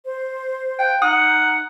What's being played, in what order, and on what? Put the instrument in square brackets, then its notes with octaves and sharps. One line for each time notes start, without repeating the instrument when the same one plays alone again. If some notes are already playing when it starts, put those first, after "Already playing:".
[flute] C5
[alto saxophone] G5
[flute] D#4 [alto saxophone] F#5 [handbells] D#6